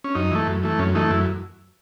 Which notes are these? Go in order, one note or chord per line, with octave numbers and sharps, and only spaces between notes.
C#4
F#2 D#4
E3 A3
F#2
E3 A3
F#2 C#4
E3 A3 D#4
F#2 E4